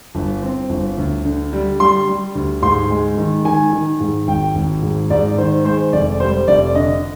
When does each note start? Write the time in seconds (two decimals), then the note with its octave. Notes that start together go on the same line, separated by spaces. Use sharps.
0.15 G1
0.42 C4
0.70 G1
0.98 D2
1.25 D3
1.53 G3
1.80 G3 C6
2.08 G3
2.35 D2
2.62 G#2 C6
2.90 G#3
3.17 D#3
3.45 D#3 G#5
3.73 D#3
4.00 G#2
4.28 G#1 G5
4.55 G#1
4.83 G#2
5.10 G#2 D5
5.38 D#3 C5
5.65 G#3 C5
5.93 F1 D5
6.20 G3 C5
6.48 F1 D5
6.75 D3 D#5